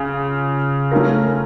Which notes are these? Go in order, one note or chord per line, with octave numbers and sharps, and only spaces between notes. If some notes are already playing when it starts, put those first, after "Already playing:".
Already playing: C#3 F4
A3 C#4 F4 A#4